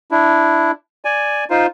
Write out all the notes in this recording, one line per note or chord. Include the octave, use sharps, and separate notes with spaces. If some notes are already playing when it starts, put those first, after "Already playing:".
D4 E4
D5 G#5
D#4 F4 C5